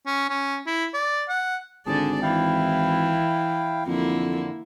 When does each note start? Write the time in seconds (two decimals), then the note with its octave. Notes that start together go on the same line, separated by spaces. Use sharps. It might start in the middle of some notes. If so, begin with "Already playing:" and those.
0.06 C#4
0.29 C#4
0.66 E4
0.94 D5
1.28 F#5
1.86 G#1 D3 G#4 D5 A5
2.22 E3 E4 F5 G5
3.87 F2 D3 A#3 E4